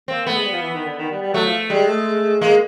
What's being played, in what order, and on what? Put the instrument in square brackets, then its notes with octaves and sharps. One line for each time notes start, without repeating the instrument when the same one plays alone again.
[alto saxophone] A#3 [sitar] C4
[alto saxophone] A3 [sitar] B3
[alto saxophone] G#3
G3
F3
E3
D#3
D3
D#3
G3
G3
[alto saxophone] F#3 [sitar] A3
[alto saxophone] F3
[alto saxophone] G3 [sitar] G#3
[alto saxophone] A3
[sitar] G#3 [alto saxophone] A#3